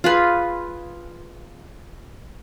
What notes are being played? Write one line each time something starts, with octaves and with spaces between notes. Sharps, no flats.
F4 G#4 B4